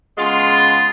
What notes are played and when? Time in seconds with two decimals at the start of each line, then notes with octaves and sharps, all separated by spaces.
0.18 C#3 G#3 B3 F4